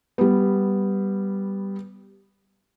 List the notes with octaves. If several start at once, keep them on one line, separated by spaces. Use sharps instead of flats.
G3 B3